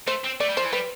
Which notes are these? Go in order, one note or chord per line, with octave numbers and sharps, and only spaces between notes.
A3 C5
C4
A3 D5
G3
F3 C5
E3
G3 B4